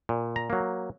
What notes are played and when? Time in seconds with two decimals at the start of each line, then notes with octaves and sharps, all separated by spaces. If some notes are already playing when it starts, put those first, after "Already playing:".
0.09 A#2
0.36 A#5
0.50 F#3 A#3